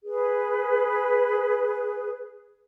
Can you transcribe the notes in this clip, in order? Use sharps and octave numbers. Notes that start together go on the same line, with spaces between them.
G#4 B4